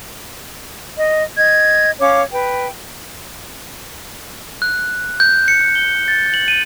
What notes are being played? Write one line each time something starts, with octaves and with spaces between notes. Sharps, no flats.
D#5
D#5 G#6
C#4 C#5 F5 D6
B4 G5
F#6
G6
C#7
G7
A6
F#7
D#7